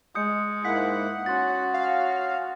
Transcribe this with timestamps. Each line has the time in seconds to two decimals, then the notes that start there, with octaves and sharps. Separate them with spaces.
0.15 G#3 D#6 G6 C#7
0.65 G#2 A#3 E4 F#5 B6
1.26 C#4 F#4 C6 A6
1.74 F5